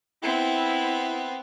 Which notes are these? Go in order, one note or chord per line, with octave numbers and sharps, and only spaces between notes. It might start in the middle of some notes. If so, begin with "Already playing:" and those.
B3 C4 E4